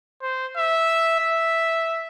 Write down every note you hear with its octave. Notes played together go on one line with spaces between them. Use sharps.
C5
E5
E5